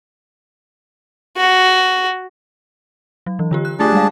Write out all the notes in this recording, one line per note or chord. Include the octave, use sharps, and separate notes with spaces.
F#4
F#3
E3
D3 F4 G4
F#6
A3 D4 F4 G4 G#4 A5
G3 G#3 F5